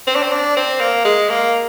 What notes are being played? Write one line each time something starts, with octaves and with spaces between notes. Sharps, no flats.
C4
D4
C4
D4
C4
A#3
G#3
A#3